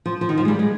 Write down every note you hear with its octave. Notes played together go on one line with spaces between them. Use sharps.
F3
F3
D#3
F3
G#3
G3
G#3